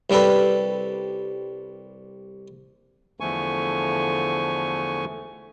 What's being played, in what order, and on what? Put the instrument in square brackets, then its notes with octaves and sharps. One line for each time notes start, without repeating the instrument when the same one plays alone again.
[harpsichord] C2 G3 D4 A4 B4
[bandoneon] E2 D3 F3 A3 G#5 C#6